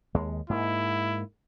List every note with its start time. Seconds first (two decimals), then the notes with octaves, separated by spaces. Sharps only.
0.14 D#2 G#3
0.50 G#2 A#3 E4